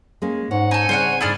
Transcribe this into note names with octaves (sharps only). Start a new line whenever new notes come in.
G#3 A#3 C#4
G#2 C#5 F#5
D#4 A4 G#5
C#3 G3 C4 C5 C#5 F#5
G#2 D3 E4 G#4 D5 F6